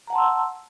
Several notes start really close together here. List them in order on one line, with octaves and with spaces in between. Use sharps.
A#5 F#5 A5 C6 E6